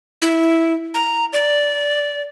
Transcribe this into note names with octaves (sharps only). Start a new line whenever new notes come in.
E4
A#5
D5